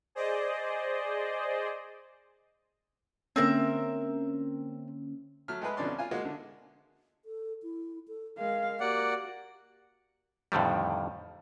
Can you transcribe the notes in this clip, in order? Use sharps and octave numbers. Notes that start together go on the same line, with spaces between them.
G#4 C5 D5 D#5
D3 A#3 C4 C#4 A#4 E5
F#3 A3 F6
G#3 A3 G#4 B4
F2 B2 D3 C#4 D5 C6
F4 G#5
G#3 A#3 F#4
D3
A4
E4
A4
G#3 A#4 F5
A#3 F#4 G4 D5 F#5
F2 A2 D3 D#3 G3